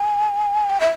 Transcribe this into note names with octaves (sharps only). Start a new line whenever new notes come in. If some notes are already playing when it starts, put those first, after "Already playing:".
Already playing: G#5
G5
E5